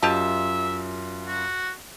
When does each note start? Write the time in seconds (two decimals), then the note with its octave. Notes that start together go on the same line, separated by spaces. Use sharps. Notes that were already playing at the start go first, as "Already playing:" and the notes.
0.03 F#2 F4 G4 D#5 E5 A5
1.27 F#4